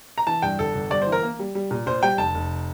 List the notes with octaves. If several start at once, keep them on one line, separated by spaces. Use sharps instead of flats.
A#5
E3 A5
G2 G5
G1 A4
G1
G2 D5
C5
E3
A#4
A#3
G3
G3
A#2
A#2 C5
G3 G5
F1 A5
F1